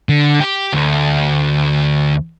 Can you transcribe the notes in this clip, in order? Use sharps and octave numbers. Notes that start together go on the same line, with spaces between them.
D3
G4
D2